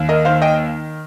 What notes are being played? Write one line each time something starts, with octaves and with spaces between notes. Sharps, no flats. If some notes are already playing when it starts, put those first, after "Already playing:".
Already playing: D#2
A#4 D#5
D#3 C5 F5
D#5 G5